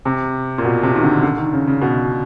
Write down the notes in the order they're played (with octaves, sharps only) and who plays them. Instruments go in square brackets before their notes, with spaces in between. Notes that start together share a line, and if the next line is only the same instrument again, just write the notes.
[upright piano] C3
A#2
B2
C3
D#3
D3
D3
D#3
C#3
C#3
B2